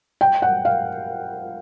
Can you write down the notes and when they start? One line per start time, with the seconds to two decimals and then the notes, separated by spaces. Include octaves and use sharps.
0.21 G5
0.42 F#5
0.65 F5